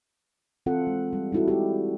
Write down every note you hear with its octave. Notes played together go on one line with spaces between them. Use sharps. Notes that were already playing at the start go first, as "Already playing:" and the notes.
E3 C4 F4 A4 F#5
G#3
G3
G3 D#4 E4 F#4 A4
G#3 E4 G4